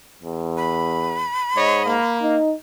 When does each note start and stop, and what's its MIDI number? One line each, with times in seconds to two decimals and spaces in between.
0.23 1.28 40
0.57 2.18 83
1.56 1.97 44
1.56 1.83 73
1.56 1.83 75
1.86 2.37 58
2.22 2.53 63